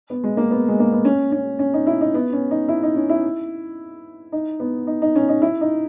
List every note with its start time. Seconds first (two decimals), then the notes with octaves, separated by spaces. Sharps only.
0.10 B3
0.24 G#3
0.37 A#3
0.51 B3
0.68 G#3
0.80 A#3
0.92 B3
1.05 C#4
1.32 C#4
1.59 C#4
1.74 D#4
1.87 E4
2.01 D#4
2.14 B3
2.33 C#4
2.51 D#4
2.68 E4
2.83 D#4
2.96 C#4
3.09 E4
4.32 D#4
4.60 B3
4.87 D#4
5.02 D#4
5.16 C#4
5.29 D#4
5.42 E4
5.61 D#4